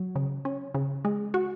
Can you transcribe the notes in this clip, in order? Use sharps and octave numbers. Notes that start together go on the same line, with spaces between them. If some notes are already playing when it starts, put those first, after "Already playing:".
Already playing: F#3
C#3
C#4
C#3
G#3
F#4